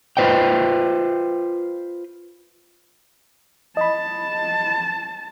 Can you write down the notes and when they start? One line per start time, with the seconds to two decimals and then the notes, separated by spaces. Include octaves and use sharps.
0.17 F4 B4 C5 D#5 G5
3.77 D#5 A5 B5